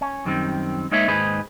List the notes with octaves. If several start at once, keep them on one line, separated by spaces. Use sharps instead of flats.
C#4
F#2 D#3 G3 C4
G#3 A#3 D#4 B4 C#5 E5
D#2 G#2 D#4 G#4 B4 C5